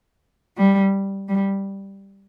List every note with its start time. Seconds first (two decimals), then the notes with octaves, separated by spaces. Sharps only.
0.57 G3
1.28 G3